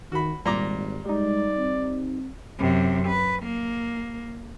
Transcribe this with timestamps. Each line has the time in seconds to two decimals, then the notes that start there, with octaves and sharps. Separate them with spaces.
0.12 D#3 F#4 B5
0.45 G#1 A#2 G3 A#5 D6
1.05 G3 G#3 D#4 D5
1.58 C4
2.59 F#2 C3
3.08 B4
3.43 A#3